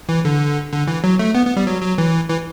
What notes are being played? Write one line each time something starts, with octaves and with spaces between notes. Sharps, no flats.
E3
D3
D3
E3
F#3
A3
B3
B3
G3
F#3
F#3
E3
E3